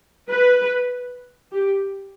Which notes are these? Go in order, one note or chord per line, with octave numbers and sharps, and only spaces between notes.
B4
G4